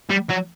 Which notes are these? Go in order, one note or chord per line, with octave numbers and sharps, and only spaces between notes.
G3
F#3